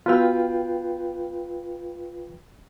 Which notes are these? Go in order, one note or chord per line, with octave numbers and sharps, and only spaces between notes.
B3 F4 F#4 B4 G5